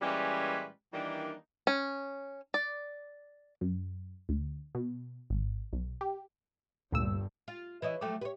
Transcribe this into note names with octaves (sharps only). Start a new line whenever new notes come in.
A#2 E3 G3 G#3 C#4 B4
D#3 E3 G3 A#3 D4 D#4
C#4
D5
F#2
D2
B2
G#1
B1
G4
G1 D2 G2 A#2 E6
F4
E3 E4 B4 C#5 D#5 E5
F3 F#3 A3 G5 D6
G4 B4 C#5